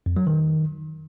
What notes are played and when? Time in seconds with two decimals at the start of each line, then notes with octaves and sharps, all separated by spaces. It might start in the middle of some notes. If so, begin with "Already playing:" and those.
0.06 F2
0.17 F#3
0.27 D#3